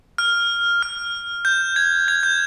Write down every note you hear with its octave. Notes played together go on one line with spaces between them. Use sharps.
F6
F6
G6
G#6
G#6
G6